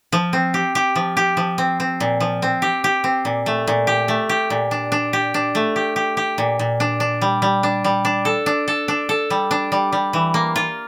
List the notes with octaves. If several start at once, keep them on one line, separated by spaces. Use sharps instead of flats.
F3
C4
G4
G4
F3
G4
F3
C4
C4
A#2
F3
C4
G4
G4
C4
A#2
A3
A#2
G4
A3
G4
A#2
D4
D4
G4
D4
A3
G4
G4
G4
A#2
A#2
D4
D4
G3
G3
D4
G3
D4
A4
D4
A4
D4
A4
G3
D4
G3
G3
E3
A#3
F4